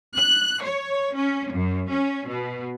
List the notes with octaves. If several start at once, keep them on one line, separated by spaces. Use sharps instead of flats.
F#6
C#5
C#4
F#2
C#4
B2